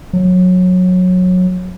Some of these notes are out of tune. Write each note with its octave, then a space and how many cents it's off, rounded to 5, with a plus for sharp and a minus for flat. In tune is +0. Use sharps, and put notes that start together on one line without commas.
F#3 -20